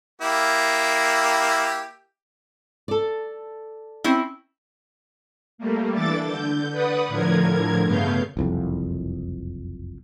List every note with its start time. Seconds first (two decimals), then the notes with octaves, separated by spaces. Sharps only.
0.21 A#3 E4 G4
2.88 A4 D5
4.04 C4 C#4 E4
5.58 G3 A3 A#3
5.93 E3 D4 A4 D6 A6
6.25 D3 G6
6.71 B4 D5 F#5 D#6
7.08 A2 D3 F3 A#4 G#6
7.84 G2 C#3 A3 B3 F5 G6
8.37 F#1 C2 F2